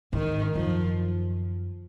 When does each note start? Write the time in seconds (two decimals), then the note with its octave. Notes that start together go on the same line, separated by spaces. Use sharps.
0.13 G#2 D#3
0.55 F#2 F3